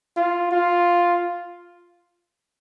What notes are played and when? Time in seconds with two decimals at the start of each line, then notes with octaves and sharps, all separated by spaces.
0.17 F4
0.51 F4